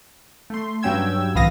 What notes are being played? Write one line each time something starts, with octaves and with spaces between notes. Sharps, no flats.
A3 C6
G2 F#3 C#4 G5 E6 G#6
C2 A2 E3 F5 D#6 A#6